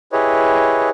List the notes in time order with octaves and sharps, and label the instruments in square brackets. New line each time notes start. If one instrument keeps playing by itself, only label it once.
[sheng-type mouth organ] E4 G4 G#4 B4 C#5 D#5